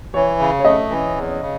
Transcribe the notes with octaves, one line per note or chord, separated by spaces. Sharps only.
E3 C#5
C#3
C#5
A3 D#5
E3
E2
C#3